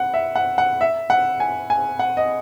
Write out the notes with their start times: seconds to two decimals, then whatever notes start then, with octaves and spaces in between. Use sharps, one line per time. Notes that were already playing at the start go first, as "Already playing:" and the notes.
Already playing: F#5
0.14 E5
0.35 F#5
0.58 F#5
0.81 E5
1.10 F#5
1.40 G#5
1.70 G#5
1.99 F#5
2.17 D#5